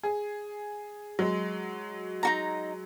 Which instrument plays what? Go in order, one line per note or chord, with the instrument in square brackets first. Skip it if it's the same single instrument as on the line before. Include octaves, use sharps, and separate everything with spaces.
[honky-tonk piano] G#4
F#3 G#3
[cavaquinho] D#4 F#4 A#5